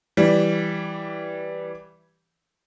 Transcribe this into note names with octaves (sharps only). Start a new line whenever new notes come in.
E3 G3